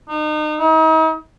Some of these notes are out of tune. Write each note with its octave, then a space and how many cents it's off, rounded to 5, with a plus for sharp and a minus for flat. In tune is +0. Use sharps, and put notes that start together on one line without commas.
D#4 -35
D#4 +40